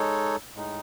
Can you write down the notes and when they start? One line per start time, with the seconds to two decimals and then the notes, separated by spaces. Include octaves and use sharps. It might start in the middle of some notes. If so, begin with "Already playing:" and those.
Already playing: G#3 D#4 A4 C#5
0.56 A2 G#3 D#4